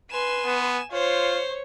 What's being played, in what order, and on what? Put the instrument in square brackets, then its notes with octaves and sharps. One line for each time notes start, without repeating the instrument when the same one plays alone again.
[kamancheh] B4 C6 [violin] G#5 E7
[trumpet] B3
[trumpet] F4 [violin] C5 [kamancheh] C#5